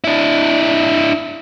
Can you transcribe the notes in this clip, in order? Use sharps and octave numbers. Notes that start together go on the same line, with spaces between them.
D4 E4